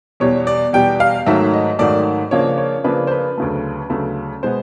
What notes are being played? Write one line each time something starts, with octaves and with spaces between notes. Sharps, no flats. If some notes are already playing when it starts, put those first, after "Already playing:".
E2 B2 G3 C#5
D5
E2 B2 G3 G5
F5
G#2 D#3 F#3 A3 E5
D#5
G#2 D#3 F#3 A3 D5
C#3 F3 A#3 D4 C#5
C#5
C#3 F3 A#3 D4 B4
C5
B4
D2 C#3 F#3 A3
D2 C#3 F#3 A3
B2 G#3 B3 C5